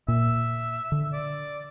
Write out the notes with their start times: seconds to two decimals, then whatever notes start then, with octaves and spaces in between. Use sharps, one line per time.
0.08 A#2 E5
0.92 D3
1.13 D5